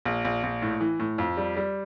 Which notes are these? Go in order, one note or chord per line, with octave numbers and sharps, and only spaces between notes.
A#1
A#1
A#1
A2
E3
A2
F2
G3
G3